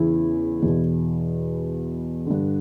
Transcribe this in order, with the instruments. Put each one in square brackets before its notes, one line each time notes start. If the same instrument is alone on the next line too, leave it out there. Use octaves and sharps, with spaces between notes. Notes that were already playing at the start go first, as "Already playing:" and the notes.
Already playing: [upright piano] E2 C#3 E3 E4
E2 B2
G2 D3